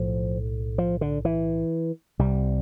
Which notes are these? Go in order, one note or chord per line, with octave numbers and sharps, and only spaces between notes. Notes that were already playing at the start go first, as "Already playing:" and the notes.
Already playing: B1 A2 F3
F3
D3
E3
C2 C3 G3